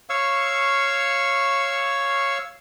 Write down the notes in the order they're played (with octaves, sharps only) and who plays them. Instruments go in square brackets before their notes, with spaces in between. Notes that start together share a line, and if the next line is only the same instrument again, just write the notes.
[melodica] C#5 F5 C#6 E6